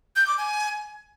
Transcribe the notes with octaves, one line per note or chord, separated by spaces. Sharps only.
G6
D6
G#5